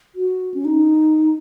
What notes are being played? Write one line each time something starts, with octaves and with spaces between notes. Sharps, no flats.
F#4
C#4
D#4